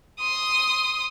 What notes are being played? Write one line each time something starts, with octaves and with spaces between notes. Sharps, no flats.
C6 D#6